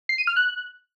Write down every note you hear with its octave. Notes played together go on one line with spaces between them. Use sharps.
C7
D#7
F6
F#6